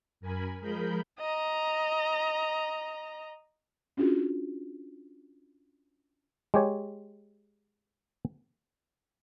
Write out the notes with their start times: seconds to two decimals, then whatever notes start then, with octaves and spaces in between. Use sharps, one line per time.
0.21 F#2 A#4 G#5 B5
0.61 F3 G#3 G#4 A#4 B5 G6
1.19 D#5 A#5
3.97 C#4 D4 F4 F#4 G#4
6.54 G#3 G4 C#5